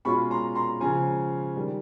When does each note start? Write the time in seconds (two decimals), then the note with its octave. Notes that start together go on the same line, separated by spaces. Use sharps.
0.05 B2 G#3 C#4 F4 B5 C#6
0.31 A#5 C6
0.55 A#5 C6
0.80 C#3 F3 G#3 C#4 F4 G#5 A#5
1.56 D#3 G3